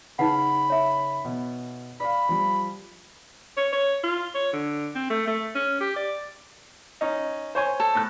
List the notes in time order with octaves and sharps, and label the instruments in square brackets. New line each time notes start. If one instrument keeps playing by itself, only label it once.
[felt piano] C#3 [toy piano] D#4 B4 F#5 [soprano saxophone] B5
[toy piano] C#5 E5
[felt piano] B2
[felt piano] D5 F5 [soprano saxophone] B5
[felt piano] F3 G3
[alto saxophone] C#5
C#5
F4
C#5
D3
C4
A3
A3
C#4
G4
D5
[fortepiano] C#4 D#4
C5 C#5 G#5
[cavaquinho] A4
[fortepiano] A2 F#6